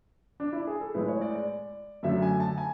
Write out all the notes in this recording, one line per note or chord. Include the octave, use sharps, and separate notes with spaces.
D4
E4
G#4
A4
A2 G#3 B4
C#5
D5
D5
F#2 D3 F#3 A3 E5
G#5
A5
G#5